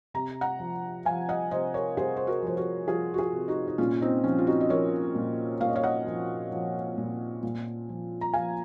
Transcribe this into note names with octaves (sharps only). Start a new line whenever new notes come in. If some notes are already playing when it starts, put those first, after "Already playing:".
C3 A#5
F#5 A#5
F3
F3 F5 G#5
D#5 F#5
C3 C5 D#5
A#4 C#5
C3 G#4 C5
C5
F#4 A#4
F3 C5
F#4 A#4
F3 F4 G#4
F#4
F4 G#4
C3
D#4 F#4
D#4
A#2 C#4 F4
C4 D#4
F3 C#4
F4
D#4 F#4
D#5
F3 A#4 C#5
A#2
A#2 F5
D#5
C#5 F5
D#5 F#5
F3
F3
A#2
A#2
F3
A#5
F3 F5 G#5